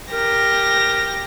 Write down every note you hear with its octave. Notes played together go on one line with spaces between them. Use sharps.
G4 A#4 A#6